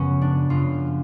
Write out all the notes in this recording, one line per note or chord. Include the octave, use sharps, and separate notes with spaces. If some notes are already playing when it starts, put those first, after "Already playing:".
Already playing: F#2 C#3 F3 B3 C#4
D4
F#2 C#3 F3 F4